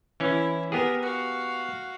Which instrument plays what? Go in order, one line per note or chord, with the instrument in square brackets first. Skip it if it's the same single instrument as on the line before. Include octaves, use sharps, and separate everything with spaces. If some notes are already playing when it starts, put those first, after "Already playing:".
[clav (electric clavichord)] E3 C#4 [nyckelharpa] E4
[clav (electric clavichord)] B3 G4 G#4 [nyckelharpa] A#4 B4
[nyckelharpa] F#4 F5